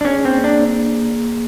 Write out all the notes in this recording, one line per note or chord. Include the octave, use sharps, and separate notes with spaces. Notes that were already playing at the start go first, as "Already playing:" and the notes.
D4
C#4 G#4
A#3 C4
A#3 D4